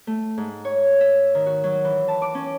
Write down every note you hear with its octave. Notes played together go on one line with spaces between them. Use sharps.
A3
G#2
C#5
E5
D#3
F#4
F#3
E3
A5
D6
C#4